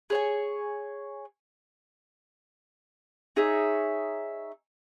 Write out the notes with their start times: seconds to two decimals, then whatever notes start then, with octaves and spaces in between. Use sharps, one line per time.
0.10 G#4 C#5 G#5
3.36 D#4 G#4 C#5 E5